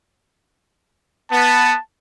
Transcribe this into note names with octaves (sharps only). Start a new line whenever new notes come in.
B3 A5